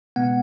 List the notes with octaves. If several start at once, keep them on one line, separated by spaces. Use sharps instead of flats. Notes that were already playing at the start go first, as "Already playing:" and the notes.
B2 G#3 B3 F#5